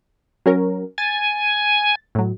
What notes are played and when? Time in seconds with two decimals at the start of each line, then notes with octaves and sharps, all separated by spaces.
0.46 F#3 C#4 A#4
0.98 G#5 A6
2.15 A2 F#3